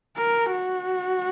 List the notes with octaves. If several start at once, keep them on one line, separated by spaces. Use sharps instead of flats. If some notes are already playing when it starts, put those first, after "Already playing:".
A#4
F#4